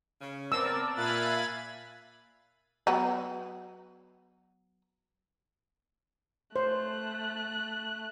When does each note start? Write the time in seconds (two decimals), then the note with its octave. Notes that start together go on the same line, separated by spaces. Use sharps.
0.21 C#3 C#4
0.52 B3 C4 A#4 D5 A5 E6
0.96 A#2 E5 F5 G#5 B5 F#6 A6
2.87 F#3 B3
6.56 A3 C5 F#6